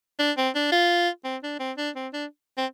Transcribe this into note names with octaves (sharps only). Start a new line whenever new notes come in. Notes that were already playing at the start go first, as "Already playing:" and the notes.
D4
C4
D4
F4
C4
D4
C4
D4
C4
D4
C4